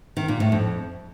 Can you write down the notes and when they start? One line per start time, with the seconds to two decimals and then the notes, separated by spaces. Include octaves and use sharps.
0.17 D#3
0.28 A#2
0.40 A2
0.52 F2